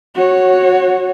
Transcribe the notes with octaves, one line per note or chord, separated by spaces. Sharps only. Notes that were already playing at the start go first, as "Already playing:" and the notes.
F#4 C#5